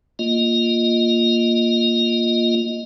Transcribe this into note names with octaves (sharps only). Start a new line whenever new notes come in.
A#3 F4 D#5